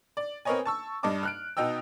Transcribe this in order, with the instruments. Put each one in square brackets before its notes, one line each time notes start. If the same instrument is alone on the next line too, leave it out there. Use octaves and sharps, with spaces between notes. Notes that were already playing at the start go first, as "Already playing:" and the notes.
[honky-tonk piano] D5
C4 A#4 B4 C#5 D#5 G#5
A5 C#6 E6
G2 D4 D#5 A5 D6
F6 F#6 D7
B2 D#4 D#5 G5 E6